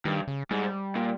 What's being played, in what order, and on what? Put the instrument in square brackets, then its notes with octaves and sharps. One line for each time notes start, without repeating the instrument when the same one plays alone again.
[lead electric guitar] G2 [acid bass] D#3
[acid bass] C#3
[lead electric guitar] G#2 [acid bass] G3
[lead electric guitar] A#2